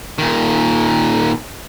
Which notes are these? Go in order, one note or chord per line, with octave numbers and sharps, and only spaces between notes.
A#2 D#3